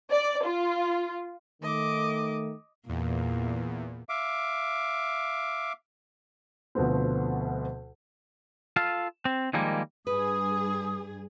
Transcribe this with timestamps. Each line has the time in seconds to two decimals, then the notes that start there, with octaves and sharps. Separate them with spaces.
0.11 D5
0.45 F4
1.63 D#3 A3 D#5 D6
2.89 E2 A#2
4.09 E5 F5 D6
6.75 D2 B2 F3 A3 B3 C4
8.76 F4 A4 F5
9.25 C4
9.53 D#3 F3 G3 G#3 A#3
10.07 G2 G#4 B4 D#6